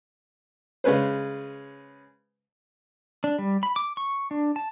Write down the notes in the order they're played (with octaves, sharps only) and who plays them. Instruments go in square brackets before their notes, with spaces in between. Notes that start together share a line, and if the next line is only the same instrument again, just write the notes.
[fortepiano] C#3 G#3 C#4 B4 C5
[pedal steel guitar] D4
G3
B5
D6
C#6
D4
A5